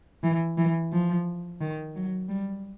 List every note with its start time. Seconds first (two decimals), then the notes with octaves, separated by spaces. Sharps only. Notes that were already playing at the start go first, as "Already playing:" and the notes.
0.23 E3
0.58 E3
0.92 F3
1.61 D#3
1.95 F#3
2.29 G3